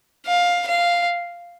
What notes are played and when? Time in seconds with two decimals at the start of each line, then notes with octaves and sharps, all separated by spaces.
0.26 F5
0.67 F5